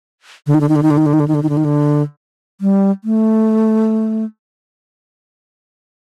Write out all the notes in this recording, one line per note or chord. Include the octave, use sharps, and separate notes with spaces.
D3
D#3
D3
D#3
D3
D#3
D3
D#3
D3
D#3
D3
D#3
D3
D#3
D3
D#3
D3
G3
A3